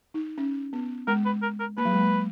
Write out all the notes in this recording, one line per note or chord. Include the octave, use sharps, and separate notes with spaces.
D#4
C#4
B3
G#3 A#4
B4
A#4
A#4
A#3 B4
F#3
G#3
A#3